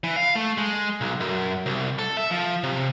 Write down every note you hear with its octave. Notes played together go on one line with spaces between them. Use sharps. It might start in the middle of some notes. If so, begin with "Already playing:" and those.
E3
F5
A3
G#3
B1
F#2
C2
A4
E5
F3
C3